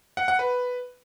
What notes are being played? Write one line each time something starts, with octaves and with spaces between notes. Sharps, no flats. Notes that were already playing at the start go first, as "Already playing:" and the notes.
F#5
F#5
B4